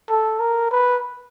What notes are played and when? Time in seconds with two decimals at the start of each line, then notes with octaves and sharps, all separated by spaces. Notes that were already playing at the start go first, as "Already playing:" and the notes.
0.10 A4
0.40 A#4
0.72 B4